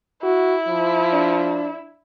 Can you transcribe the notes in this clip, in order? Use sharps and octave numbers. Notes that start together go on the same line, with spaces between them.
E4 F#4
F3
D4